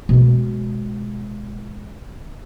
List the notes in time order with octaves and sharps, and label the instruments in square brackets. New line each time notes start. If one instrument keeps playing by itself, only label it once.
[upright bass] B2 G#3